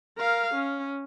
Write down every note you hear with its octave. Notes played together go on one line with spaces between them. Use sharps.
A#4 F5
C#4